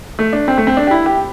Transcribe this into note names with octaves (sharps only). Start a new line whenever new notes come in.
A3
D4
C4
A3
C4
D4
G4
E4
G4